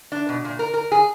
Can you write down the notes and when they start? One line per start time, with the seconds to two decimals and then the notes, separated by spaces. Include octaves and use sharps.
0.12 D4
0.29 B2
0.45 A#2
0.59 A#4
0.74 A#4
0.92 G#4